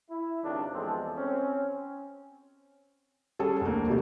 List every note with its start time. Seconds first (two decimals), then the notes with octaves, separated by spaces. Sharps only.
0.11 E4
0.44 G#1 C#2 C3 D#3 D4
0.74 E2 G2 F3 G#3 C4 A4
1.18 C4 C#4
3.39 G3 C#4 G#4 A4
3.61 F1 D2 A3 A#3
3.88 A#1 C3 G4